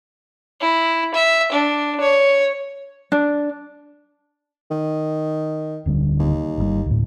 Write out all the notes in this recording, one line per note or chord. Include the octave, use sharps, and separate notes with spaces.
E4
E5
D4
C#5
D4
D#3
D1 D3 G3
D#2
G1 D3 G3
D2 A2